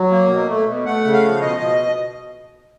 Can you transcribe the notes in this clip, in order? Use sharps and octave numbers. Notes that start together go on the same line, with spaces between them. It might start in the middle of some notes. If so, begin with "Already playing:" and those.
Already playing: F#3
A#3
B2
A3
B2
A3 F#5
C#3
F5
F3
B2 D#5
B2